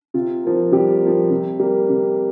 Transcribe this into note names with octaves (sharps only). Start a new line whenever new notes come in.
C3 F4
F3 A#3
C3 G3 G4
F3 A#3
C3
G3 A#3
C3